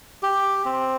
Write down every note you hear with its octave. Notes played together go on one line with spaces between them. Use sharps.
G4
C4